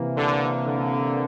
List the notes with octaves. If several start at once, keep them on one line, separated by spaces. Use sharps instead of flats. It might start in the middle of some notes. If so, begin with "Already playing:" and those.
Already playing: C3 E3 A#3
D3
D3